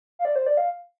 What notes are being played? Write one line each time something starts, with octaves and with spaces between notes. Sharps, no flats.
F5
D5
C5
D5
F5